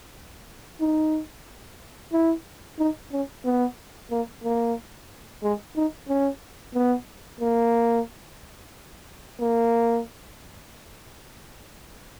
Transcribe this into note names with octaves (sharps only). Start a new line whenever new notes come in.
D#4
E4
D#4
C#4
B3
A#3
A#3
G#3
D#4
C#4
B3
A#3
A#3